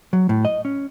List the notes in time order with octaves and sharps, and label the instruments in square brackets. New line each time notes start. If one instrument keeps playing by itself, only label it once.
[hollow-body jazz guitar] F#3
A2
D#5
C#4